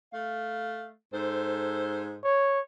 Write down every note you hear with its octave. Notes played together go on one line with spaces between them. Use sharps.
A3 F5
G#2 A4 C5
C#5